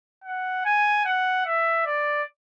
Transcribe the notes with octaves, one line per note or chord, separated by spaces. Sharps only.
F#5
G#5
F#5
E5
D5